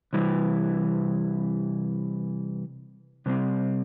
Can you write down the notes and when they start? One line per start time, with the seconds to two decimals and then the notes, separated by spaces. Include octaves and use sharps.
0.13 C3 E3 G3
3.26 C3 G3 C4